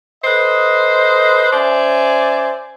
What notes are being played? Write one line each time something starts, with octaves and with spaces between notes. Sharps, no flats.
A4 B4 C5 D#5
C#4 C5 D5 E5 G#5